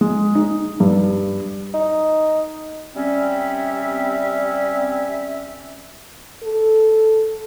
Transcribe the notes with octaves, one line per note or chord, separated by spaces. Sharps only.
G#3
D#4
G2
D#4
G3 C4 C#4 E5
A4